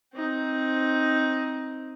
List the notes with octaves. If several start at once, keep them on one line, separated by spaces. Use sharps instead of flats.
C4 D#4